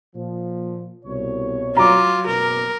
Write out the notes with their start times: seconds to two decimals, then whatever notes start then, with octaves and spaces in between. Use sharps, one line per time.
0.16 A#2 F3
1.05 C2 B2 C#5
1.77 F#3 F4 A#5 D6
2.27 F#1 B2 A#4